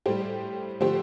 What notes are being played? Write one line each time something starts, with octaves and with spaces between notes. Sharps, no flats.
A2 G3 G4 C5
D3 F3 A3 G4 C5